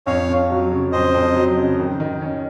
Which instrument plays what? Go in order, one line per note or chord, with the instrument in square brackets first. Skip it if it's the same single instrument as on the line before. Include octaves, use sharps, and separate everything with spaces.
[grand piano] F2 [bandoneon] C#5 F5
[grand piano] F2
F#3
C#3
[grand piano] F2 [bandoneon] C5 D#5
[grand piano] F2
F#3
C#3
D#3
D#3
C#4